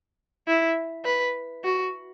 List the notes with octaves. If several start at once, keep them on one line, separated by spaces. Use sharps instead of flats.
E4
B4
F#4